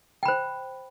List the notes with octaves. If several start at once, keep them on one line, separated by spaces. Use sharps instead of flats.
C5 G5 B5